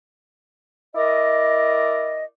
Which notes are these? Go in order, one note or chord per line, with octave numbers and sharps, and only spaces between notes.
E4 A#4 D5 D#5